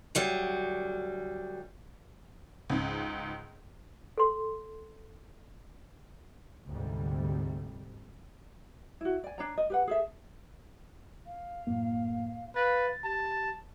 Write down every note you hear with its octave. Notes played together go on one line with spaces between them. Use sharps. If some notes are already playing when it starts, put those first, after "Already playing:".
D2 F#3 G3
C#2 G#2
A4 C6
D2 G#2 C3 G3
E4 F#4
D5 G#5
D4 C#5 A#5
D#5
G4 B4 F#5
G#4 A4 E5
F5
F#2 A2 A#3
B4 F5 A6
G4 A5